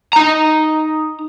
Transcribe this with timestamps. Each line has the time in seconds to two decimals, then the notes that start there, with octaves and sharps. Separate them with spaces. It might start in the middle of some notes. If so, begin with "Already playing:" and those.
0.13 D#4 A#5